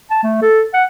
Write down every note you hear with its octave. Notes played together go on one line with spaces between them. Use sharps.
A5
A3
A4
F#5